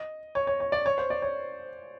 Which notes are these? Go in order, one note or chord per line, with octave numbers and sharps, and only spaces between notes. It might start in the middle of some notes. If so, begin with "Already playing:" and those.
Already playing: D#5
C#5
C#5
C#5
D5
C#5
C5
D5
C#5